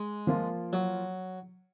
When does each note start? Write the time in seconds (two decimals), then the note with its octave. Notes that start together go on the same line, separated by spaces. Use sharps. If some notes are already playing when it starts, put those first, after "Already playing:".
Already playing: G#3
0.27 F3 A#3 F4
0.73 F#3